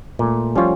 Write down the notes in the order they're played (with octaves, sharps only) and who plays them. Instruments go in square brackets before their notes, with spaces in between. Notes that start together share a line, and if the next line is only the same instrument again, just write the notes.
[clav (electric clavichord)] A#2 [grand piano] A3
[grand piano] F3 [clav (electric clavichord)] G3 C#4 F4 C#5